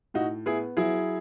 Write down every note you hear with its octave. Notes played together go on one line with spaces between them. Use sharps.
A2 D#4 F#4
B3 E4 G#4
F#3 E4 G#4